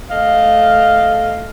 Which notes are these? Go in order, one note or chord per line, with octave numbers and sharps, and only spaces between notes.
A3 D#5 F5